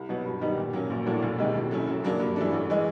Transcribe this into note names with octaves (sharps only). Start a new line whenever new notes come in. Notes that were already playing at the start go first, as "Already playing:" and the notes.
Already playing: C2
B2 F#3 B3
G2
D#3 G3 B3 D#4
A#2
F#3 A#3 C#4
A#1
A2 F#3 A#3 D4
E1
D2 C3 D#3 G#3
A2
F#3 A3 C#4 E4
F#2
C#3 F#3 A#3 D4
G2
E3 A3 D4
A1
E3 G#3